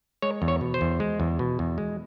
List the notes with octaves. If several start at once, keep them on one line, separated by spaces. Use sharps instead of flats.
G#3 C#5
E2
C#5
B2
C5
E2
G#3
E2
B2
E2
G#3